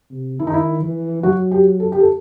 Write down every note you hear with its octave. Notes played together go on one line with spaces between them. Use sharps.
C3
D#3 E4
D#4
E4
E3
F#3 F#4
G4
A4
G4
A4